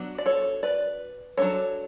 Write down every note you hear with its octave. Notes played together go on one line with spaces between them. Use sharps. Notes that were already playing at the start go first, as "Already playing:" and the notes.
Already playing: F#3 B3 D4
D5
A4 C#5
B4 D5
F#3 B3 D4 A4 C#5